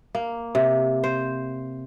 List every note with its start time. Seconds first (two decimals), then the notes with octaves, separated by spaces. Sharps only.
0.15 A#3
0.55 C3
1.04 C5